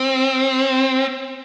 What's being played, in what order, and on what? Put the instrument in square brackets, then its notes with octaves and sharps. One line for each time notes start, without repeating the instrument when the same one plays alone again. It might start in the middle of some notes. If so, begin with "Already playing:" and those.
Already playing: [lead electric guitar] C4